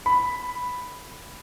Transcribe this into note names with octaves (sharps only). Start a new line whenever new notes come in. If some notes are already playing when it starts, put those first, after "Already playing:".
B5